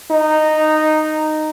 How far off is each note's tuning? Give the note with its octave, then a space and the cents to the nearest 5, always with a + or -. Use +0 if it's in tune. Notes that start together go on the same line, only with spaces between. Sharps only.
D#4 -10